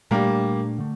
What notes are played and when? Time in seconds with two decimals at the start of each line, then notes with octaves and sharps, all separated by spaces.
0.11 A#2 G3 A3 A#3 D4
0.78 D3 A3